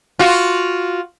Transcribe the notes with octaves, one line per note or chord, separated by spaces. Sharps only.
F4 F#4